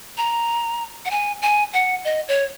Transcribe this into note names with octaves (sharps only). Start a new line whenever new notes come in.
A#5
F#5
G#5
G#5
F#5
D#5
C#5